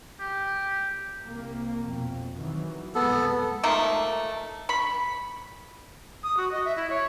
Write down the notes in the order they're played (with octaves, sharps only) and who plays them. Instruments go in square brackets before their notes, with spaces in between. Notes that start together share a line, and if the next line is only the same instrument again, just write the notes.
[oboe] G4
[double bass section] C2 A#3
F2 B2
D#3 E3 F#3
[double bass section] B1 F2 G#3 [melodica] B3 A4
[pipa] F3 A3 A#3 D#4
B5 C#6
[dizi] D#6
F#4
D#5
E5
E4
C#5